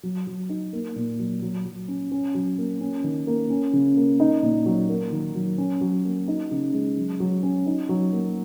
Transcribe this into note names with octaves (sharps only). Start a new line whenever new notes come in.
F#3
F#3
D#4
A#3
A#2
F#3
F#3
F#3
C#4
C#4
F#3
A#3
C#4
D#3
A#3
C#4
C#3
A#3
D#4
A#2
F#3
A#3
D#3
F#3
C#4
F#3
A#3
D#4
C#3
G#3
F#3
F#3
C#4
D#4
F#3
A#3